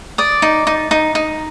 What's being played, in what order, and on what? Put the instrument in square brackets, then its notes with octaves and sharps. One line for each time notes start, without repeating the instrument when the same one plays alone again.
[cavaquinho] D5 D#6
D#4
D#4
D#4
D#4